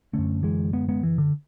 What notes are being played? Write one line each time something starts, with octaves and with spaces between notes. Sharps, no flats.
F#2 D3 A3 C#4
E3 G#3
G#3 B3
G#3 B3
E3
D3